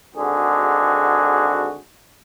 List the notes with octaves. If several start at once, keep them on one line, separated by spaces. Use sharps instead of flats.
G#1 D3 F#4 G#4